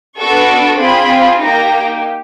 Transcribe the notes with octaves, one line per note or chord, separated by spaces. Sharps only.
B3 D4 F#4 A4 C#6
C4 F4 G#4 B5
A#3 D#4 G4 A#5